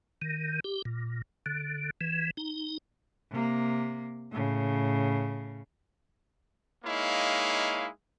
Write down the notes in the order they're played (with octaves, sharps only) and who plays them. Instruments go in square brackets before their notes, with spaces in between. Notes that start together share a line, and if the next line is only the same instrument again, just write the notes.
[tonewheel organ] D#3
G4
A#2
D3
E3
D#4
[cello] C3 A#3
A2 C#3
[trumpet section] G#3 A#3 D#4 E4 C#5 F5